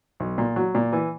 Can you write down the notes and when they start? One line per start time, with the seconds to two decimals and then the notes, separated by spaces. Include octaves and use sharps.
0.20 B1
0.38 A#2
0.56 F#3
0.75 A#2
0.92 E3